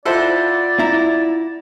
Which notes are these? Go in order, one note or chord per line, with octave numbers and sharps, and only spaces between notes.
E4 F4 A4 C5 D5 F#5
E4 A#5